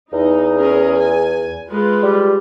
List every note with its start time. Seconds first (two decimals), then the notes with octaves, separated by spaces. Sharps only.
0.13 E2 D#4
0.58 C#4 G#4 A#4
0.96 G#5
1.70 G#3 F4 B4
2.03 G3